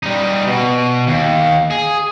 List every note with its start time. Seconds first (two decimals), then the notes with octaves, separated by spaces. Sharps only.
0.03 G3 D#4
0.47 B2
1.07 D#2
1.71 G#4